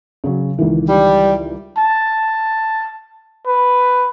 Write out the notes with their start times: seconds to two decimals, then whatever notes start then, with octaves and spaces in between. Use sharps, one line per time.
0.24 C#3 F#3
0.58 C#2 D#3 E3
0.88 G3
1.78 A5
3.47 B4